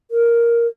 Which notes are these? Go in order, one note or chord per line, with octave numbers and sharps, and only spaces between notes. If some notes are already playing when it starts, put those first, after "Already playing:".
A#4